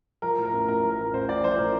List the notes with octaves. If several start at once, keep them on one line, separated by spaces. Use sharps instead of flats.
F3 A#4
A2
A#4
A1
A1 A#4
F3
A#4
A2
A1 C5
A1 D5
F3 C5
A2 A#4